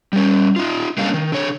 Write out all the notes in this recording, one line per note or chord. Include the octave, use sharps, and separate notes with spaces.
G3 C#4
D#4 F4
D3 G3 A#3 C#4 D#5 F5
D#3
D3 C#5